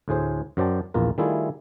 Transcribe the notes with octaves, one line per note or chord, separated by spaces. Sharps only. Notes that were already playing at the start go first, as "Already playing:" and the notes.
D2 A2 G#4 C5
F#2 F#3 C5 D5 G5 A5
A#1 E2 F4 A#4
D#3 G3 A3 E4 F4 G#4